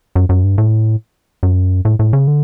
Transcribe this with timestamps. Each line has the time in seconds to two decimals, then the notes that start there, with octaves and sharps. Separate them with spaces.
0.16 F#2
0.29 F#2
0.44 G2
0.58 A2
1.43 F#2
1.85 A2
1.99 A2
2.13 C#3
2.28 D3